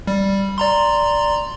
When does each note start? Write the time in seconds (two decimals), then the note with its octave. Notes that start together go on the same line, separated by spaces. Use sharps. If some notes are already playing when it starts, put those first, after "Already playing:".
0.07 G3
0.58 D5 A#5 C6